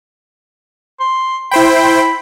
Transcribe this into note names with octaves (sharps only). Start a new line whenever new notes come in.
C6
E4 C5 G5 B5